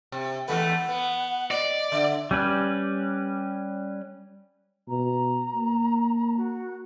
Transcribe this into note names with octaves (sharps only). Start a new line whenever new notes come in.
C3
E2 A3 B4 F#5
B3
D5 D#5
D3 E5
G3 C#4 B4
B2 A#5
A#3
F#4